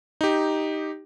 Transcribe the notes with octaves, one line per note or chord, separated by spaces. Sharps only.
D#4 G4